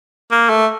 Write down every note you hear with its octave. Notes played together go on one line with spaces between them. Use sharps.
A#3
A3